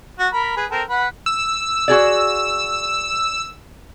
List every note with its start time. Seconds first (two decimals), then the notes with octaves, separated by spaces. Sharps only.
0.19 F#4
0.33 A#4 B5
0.57 G#4 B4
0.71 C4 A4 A#4
0.89 B4 F#5 B5
1.26 E6
1.88 F#4 G#4 D5